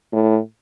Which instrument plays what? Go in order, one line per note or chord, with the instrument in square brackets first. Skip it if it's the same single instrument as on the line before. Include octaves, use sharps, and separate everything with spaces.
[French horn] A2